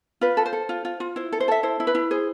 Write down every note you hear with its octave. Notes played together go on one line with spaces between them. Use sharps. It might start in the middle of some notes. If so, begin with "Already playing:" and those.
F4 B4
A4
C5
A4
F4
F4
F4
E4 C5
A4
C5
A4 E5
E4 C5
E4
B4
E4
G#4 C5